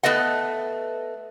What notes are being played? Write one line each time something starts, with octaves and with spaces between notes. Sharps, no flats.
A3 B3 B4 D#5 F#5